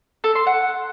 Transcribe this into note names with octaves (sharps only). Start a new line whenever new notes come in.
A4
C6
F#5